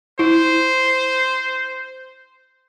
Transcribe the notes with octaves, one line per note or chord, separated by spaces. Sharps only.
E4 C5